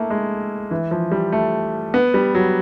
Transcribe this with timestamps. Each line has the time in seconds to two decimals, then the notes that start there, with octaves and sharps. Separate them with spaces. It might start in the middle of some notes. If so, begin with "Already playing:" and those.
Already playing: A3 A#3 E4
0.10 G#3
0.71 E3
0.91 F3
1.11 G3
1.32 A3
1.94 B3
2.14 G3
2.35 F#3